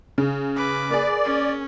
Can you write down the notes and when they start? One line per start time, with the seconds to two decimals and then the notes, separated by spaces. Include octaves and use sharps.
0.18 C#3
0.56 B4 D6
0.90 A#3 G#4 D5
1.24 C#4